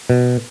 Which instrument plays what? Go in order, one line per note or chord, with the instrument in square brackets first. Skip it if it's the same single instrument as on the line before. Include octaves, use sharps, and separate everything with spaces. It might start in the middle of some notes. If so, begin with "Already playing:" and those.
[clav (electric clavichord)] B2